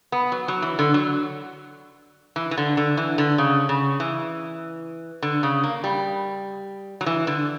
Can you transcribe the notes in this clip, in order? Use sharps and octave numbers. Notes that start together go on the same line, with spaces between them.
B3
F#3
F#3
E3
D3
F#3
E3
E3
D3
D3
E3
D3
C#3
C#3
E3
D3
C#3
A#3
G3
F#3
E3
D3